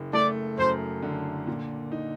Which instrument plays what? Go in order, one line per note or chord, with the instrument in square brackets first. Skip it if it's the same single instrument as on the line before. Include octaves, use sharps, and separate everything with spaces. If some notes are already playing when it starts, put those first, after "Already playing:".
Already playing: [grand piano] F#1
[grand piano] A3 [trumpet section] D5
[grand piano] F#2 [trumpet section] C5
[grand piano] D3
A#2
D#4